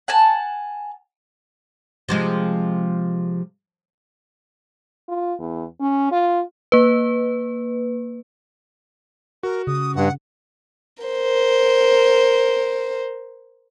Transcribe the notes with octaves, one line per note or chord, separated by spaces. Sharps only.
F#5 G#5 A5
C3 F3 G#3
F4
E2
C#4
F4
A#3 B4
F#4 A#4
C#3 D#6
G2 F#5
A#4 C5